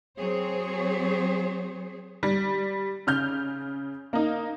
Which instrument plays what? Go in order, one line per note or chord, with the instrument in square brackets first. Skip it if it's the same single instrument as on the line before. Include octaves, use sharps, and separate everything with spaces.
[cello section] F#3 C4 G#4 C5 C#5
[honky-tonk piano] G3
C#3 F6 G6
A#3 D#4